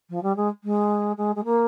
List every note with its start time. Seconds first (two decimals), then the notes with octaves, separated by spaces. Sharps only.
0.09 F3
0.22 G3
0.36 G#3
0.63 G#3
1.17 G#3
1.35 G#3
1.44 A#3